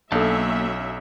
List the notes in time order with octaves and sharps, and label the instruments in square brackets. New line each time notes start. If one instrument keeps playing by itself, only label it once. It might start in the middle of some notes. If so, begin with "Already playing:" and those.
[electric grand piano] B1 [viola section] F#3 C#4 E5 [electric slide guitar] A#3 A5 [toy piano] D4 A4